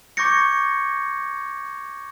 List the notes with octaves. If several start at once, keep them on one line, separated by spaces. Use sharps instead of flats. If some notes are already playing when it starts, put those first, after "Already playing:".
C#6 D6 G6 G#6 A#6 C#7